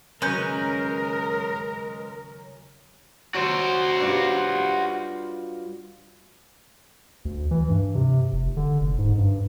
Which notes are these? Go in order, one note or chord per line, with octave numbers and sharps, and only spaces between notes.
D#2 C#3 F#3 G#3 C#4 A#4 B4 G6
F#3 F#4 C5
G2 F4
D2
E3
G2
C3
F1
D3
F1
G#2
G2